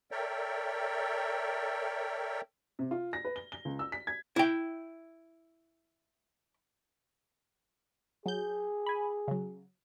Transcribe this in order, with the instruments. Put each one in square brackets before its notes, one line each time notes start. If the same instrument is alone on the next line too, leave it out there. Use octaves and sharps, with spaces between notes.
[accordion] A4 A#4 C#5 D5 E5 G5
[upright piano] C3
F4
A#6
B4
G7
G7
C#2
E6
B6
G#6
[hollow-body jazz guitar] E4 G5
[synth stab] F#3 G6 [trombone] G#4
[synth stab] G#5 B5
C#3 F#3